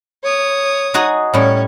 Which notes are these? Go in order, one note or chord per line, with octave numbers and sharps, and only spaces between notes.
C#5 D#6
D#4 F#4 G#4
A2 G3 C#4 C#5